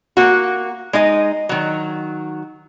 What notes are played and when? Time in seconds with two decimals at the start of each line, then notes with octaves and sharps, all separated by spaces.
0.17 A#3 F#4
0.93 G#3 D#4 D#5
1.49 D#3 F#3